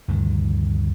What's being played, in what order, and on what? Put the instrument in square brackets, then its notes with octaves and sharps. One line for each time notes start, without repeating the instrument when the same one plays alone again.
[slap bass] D2 G2 C3 D#3